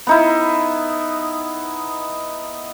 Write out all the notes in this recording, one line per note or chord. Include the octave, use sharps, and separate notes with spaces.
B3 D#4 E4